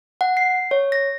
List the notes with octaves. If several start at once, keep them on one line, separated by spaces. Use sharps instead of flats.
F#5
C7
C#5
A#6